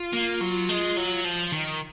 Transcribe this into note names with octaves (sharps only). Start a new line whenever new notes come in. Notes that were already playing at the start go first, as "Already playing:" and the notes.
Already playing: F4
A#3
F#3
G#3
F#3
F3
D#3